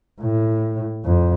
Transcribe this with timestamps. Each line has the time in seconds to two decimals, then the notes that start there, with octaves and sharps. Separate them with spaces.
0.21 A2
1.05 F2